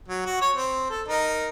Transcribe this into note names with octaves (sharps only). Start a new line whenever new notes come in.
F#3
F#4
C#5
C4
A4
D#4 A#4